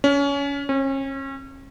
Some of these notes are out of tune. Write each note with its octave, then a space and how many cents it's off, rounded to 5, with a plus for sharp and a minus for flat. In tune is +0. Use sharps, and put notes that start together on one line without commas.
C#4 +25
C#4 -35